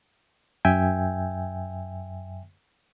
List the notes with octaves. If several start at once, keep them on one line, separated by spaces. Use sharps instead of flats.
F#2 E5 G5 G#5